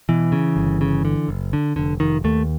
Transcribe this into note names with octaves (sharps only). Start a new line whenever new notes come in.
B2 E3
C#3
G1
C#3
D3
F#1
D3
F1 D3
F1 D#3
D#2 A3